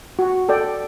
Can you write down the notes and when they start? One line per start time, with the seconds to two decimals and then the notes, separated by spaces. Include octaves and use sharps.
0.19 F#4
0.49 A4 D5 G5